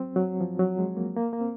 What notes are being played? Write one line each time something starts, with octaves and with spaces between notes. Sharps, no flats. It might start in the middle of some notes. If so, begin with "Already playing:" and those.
Already playing: F#3 C4
F#3
F3
F#3
G#3
A#3
A#3
A#3
C4